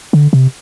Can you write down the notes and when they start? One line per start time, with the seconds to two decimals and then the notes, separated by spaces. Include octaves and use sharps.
0.13 D3
0.33 C3